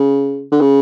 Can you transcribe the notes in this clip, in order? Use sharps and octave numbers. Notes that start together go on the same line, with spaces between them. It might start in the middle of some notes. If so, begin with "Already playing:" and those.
Already playing: C#3
D3
C#3